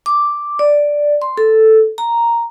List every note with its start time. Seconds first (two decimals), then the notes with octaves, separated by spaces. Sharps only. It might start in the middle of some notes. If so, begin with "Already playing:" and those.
0.06 D6
0.59 D5
1.22 C6
1.37 A4
1.98 A#5